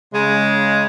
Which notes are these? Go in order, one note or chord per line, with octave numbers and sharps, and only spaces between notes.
C#3 G#3